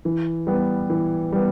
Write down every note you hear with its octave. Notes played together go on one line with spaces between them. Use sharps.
E3
G3 B3
E3
G3 B3